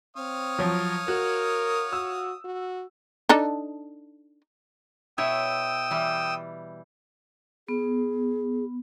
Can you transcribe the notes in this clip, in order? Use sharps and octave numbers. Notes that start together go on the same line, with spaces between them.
C4 C#5 F5 D#6
F3 F#3
F#4 A#4
F#4 E6
F#4
D4 D#4 A4
B2 E4 C#5 G5 D#6 E6
E3 G3
B3 G#4